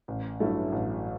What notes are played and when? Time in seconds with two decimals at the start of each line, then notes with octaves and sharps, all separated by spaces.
0.08 A1
0.40 G2 F#3 A3 E4
0.72 A1